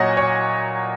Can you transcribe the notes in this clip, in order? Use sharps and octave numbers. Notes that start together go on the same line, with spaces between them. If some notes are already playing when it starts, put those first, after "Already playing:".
Already playing: A#2 F#3 C#5 D#5 F#5 G#5 A#5
C#5